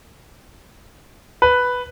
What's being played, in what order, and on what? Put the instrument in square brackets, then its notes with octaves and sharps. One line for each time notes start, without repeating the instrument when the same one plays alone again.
[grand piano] B4